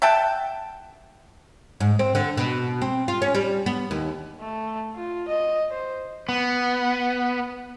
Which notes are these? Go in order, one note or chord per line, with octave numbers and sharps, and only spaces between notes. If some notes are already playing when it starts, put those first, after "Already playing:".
E5 F#5 G5 A5
G#2
C4
D3
B2
C4
F4
C#4
G3
B3
D#2
A3
F4
D#5
C5
B3